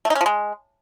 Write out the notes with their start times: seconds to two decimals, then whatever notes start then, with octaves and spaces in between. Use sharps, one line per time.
0.05 A3
0.10 D#4
0.15 C#4
0.21 F3
0.26 G#3